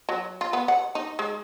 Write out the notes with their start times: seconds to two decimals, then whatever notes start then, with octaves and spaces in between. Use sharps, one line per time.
0.09 F#3
0.41 F4
0.53 B3
0.68 F#5
0.95 D#4
1.19 G#3